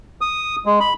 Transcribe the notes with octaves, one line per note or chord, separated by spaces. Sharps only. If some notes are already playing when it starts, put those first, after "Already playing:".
D#6
G#3
B5